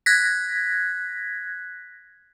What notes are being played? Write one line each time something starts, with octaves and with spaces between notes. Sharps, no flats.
F#6 G#6 A#6 B6